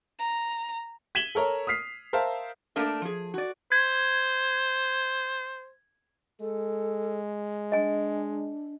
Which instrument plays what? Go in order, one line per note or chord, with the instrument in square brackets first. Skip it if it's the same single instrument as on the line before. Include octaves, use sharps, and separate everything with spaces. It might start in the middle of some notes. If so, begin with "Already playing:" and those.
[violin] A#5
[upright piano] G#6 B6 D#7 E7 F#7 G7
A4 A#4 C#5 A#5
D#6 F6 B6 C7
A#4 C5 E5 F5 A5
[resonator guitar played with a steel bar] A3 A#3 D4 A#4 E5
F3 G#4
F#4 D5
[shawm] C5 [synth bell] G#6
[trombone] G#3 [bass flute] A4
[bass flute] D4 [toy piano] D#5 G#5